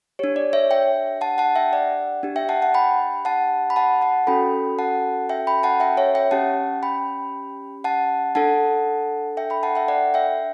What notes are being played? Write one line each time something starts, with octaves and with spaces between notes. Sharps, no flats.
D4 G4 C#5
D5
C#5 E5
E5 G5
F#5 A5
F#5 A5
E5 G5
D5 F#5
D4 G4
E5 G5
F#5 A5
F#5 A5
G5 B5
F#5 A5
B5
F#5 A5
F#5 A5
C#4 F#4 A4 G5 B5
F#5 A5
E5 G5
G5 B5
F#5 A5
E5 G5
C#5 E5
E5 G5
C#4 G4 F#5 A5
G5 B5
F#5 A5
D4 A4 F#5 A5
E5 G5
G5 B5
F#5 A5
E5 G5
D5 F#5
E5 G5